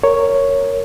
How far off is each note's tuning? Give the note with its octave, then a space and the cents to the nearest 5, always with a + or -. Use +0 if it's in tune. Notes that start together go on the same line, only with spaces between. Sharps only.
A#4 -10 C#5 +0